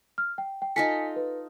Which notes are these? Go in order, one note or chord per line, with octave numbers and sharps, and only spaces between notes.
F6
G5
G5
D#4 F4 A4 G#5 B6 C#7
B4